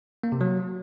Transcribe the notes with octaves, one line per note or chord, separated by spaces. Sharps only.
A#3
C3
F#3